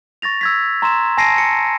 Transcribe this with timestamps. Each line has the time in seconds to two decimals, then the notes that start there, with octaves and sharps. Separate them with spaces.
0.22 C#6 A6 A#6 F7
0.41 E6 G#6 B6
0.82 A#5 C6 E6 E7
1.17 G#5 A5 A#6 C7 D7 D#7
1.38 C#7